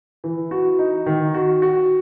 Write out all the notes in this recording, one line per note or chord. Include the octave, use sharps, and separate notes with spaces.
E3
F#4
D#4
D#3
F#4
F#4